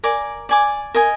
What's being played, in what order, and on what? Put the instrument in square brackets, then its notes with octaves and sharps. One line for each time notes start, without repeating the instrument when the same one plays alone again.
[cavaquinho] A#4 D5 G#5 D6
D5 G#5 D6
A#4 D#5 G#5